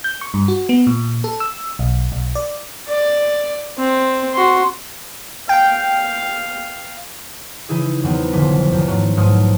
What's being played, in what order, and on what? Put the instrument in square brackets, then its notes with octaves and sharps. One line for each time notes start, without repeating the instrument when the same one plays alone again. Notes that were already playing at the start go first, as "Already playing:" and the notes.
[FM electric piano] G6
C#6
G2
F#4
B3
A#2
A4
E6
B1
B1
D5
[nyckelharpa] D5
C4
F#4 C6
[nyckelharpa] F5 [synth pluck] G5
[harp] C#3 E3 D#4 E4 G#4
E2 D#3 E3 F#3 B3 C4
F1 A#1 D3 F3 B6
E2 D#3 F#3
G#2 F3 F#3 A3
B1 G#2 A3 D#6 F6